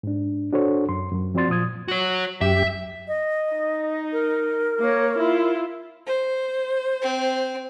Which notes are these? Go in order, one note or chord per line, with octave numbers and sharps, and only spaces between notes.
G#2 D4
D4 F#4 A4 C5 C#5
F#2 C6
F#2 F#3
F3 C4 F#4 D5 C6 A6
A#2 F3 D#6 G#6
F#4 C#5
F#2 G4 E5
D#5
D#4
A#4
A#3 C#5
E4 F4
C5
C4